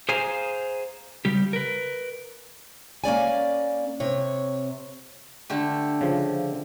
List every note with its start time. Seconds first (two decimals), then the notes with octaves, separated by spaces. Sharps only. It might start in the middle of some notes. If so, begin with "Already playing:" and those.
0.09 G#4 C5 F5 G#5 A#5
1.25 C#3 G3 G4
1.53 A#4 B4
3.04 A#3 C#4 D5 G#5
4.00 C3 C#5
5.50 D3 A3 G4
6.01 C#3 F3